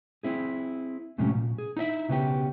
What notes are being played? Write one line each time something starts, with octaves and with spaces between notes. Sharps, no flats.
C4 E4 G#4
F2 A2 C3 F#3 G#3 C#4
A#2
G#4
D#4 E4 D#5 E5
B1 C#3 B3 C#4 G4